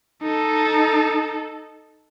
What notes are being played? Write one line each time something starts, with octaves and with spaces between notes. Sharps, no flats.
D#4 A4